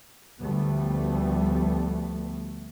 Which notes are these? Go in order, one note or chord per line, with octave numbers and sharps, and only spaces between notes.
D2 F3 G3 A3 B3